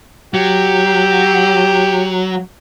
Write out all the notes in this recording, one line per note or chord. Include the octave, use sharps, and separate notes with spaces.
F#3 G4